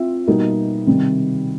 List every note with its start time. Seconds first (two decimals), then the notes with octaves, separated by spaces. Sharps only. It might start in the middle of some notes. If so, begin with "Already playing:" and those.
Already playing: C4 F4 E5
0.27 B2 G3 A#3 D#4
0.87 C3 D#3 G3 C4